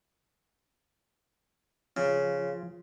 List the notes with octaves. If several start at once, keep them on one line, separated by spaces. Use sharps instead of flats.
C#3 F3